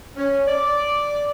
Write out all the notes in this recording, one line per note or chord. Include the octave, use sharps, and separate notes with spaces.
C#4
D5